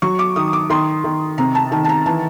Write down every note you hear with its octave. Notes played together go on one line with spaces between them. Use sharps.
F#3 C#6
D6
D#3 D#6
D6
D#3 C6
D#3
C3 A#5
A5
D#3 A5
A5
A#5
E3 A5